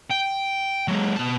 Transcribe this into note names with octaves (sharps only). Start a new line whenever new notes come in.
G5
F#3 G#3
B2 A5